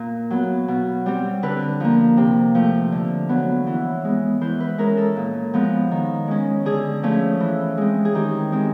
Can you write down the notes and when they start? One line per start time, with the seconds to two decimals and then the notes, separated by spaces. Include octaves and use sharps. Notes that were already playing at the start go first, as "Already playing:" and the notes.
Already playing: A#2
0.31 F#3 B3
0.68 B2
1.06 G3 C4
1.43 D3 B4
1.80 F3 A#3
2.17 C3
2.55 F3 A3
2.92 D3
3.29 F#3 B3
3.67 E3
4.04 G#3 B3
4.41 E3 C5
4.60 B4
4.78 G#3 C#4 A#4
4.97 A4
5.16 A#2
5.54 F3 G#3 B3
5.91 D#3
6.28 G#3 C#4
6.65 D3 G#4
7.03 F3 A3 C#4
7.40 E3
7.77 G#3 C4
8.05 G#4
8.15 D#3 G4
8.52 G#3 C4